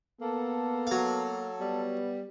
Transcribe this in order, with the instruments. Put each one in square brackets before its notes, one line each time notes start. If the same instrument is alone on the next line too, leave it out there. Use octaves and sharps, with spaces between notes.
[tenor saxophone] A#3 [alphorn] B3 [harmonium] A4
[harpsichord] F#3 F5
[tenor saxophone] G3 [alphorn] B3